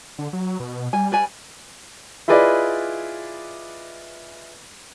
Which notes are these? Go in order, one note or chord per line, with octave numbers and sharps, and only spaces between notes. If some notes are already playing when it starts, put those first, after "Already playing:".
D3
F#3
B2
G3 G#5
B4 D5 G#5
E4 F4 G#4 B4 D5 D#5